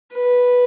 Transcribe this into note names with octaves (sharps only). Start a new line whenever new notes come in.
B4